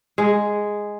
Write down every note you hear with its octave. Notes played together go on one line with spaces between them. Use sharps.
G#3